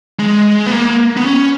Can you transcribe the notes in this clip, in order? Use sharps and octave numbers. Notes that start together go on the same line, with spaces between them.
G#3
B3
A#3
B3
C#4